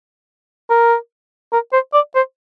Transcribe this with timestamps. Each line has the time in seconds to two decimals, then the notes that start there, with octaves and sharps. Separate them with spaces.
0.70 A#4
1.52 A#4
1.73 C5
1.93 D5
2.15 C5